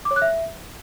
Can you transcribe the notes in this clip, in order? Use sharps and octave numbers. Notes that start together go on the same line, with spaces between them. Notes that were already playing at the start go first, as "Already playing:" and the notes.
D6
C#5
F#6
E5